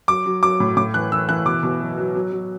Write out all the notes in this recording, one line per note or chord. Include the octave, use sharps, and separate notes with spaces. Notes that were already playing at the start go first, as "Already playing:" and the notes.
F#3 D6
F#3
F#3 D6
A2
A2 D6
E3 F#6
E3 E6
E3 F#6
B2 D6
B2
F#3
F#3
F#3
F#3